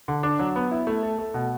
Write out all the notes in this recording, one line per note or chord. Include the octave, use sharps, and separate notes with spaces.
D3
D4
F#3
B3
E4
A3
A4
A3
B2